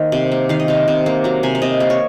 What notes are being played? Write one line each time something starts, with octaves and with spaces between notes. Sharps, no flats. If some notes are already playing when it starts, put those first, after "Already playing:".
Already playing: D#3 A#3 C5
C3
A#3
D#3 F5
D#5
C3 F5
C3
A#3
F#3 A#5
C3 G#5
F5
C3 D#5
A#3
C#5